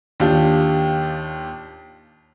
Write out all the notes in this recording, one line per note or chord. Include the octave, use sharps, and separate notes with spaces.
D#2 D4 F4 G4